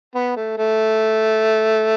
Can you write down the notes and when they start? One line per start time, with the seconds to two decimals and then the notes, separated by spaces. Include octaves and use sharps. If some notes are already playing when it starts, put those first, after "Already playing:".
0.15 B3
0.36 A3
0.58 A3